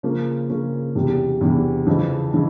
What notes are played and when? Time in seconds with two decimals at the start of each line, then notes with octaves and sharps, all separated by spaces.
0.03 C#3 F3 A#3 C#4
0.50 C#3 F3 A#3 C#4
0.95 E2 C3 E3
1.41 E2 C3 E3
1.87 F2 C#3 E3
2.33 C#3 E3